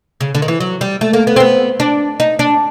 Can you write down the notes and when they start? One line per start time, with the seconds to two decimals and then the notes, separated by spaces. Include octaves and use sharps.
0.21 C#3
0.35 D3
0.42 D#3
0.48 E3
0.60 F#3
0.81 G3
1.01 A3
1.13 A#3
1.27 B3
1.36 C4
1.40 B3
1.80 D4
2.20 D#4
2.39 D4